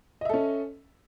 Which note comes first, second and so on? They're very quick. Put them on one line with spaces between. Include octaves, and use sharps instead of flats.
D#5 E5 A4 C#4